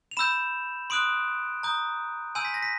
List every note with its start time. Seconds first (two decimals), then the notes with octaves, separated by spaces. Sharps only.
0.11 F7
0.17 B5 E6 G6 E7
0.90 C6 D#6 F#6 D7
1.63 A#5 D#6 G6
2.35 G#5 C6 E6 G6 D#7
2.45 B6
2.54 A#6
2.62 B6